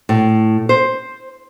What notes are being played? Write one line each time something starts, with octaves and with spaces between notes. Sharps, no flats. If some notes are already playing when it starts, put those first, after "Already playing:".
A2
C5